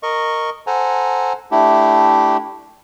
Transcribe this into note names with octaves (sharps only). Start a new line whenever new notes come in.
A#4 D#5 C#6
A4 C5 F#5 G#5 A#5
A3 D4 E4 G4